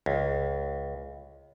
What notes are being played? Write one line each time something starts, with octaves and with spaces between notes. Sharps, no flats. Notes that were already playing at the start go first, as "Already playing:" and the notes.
C#2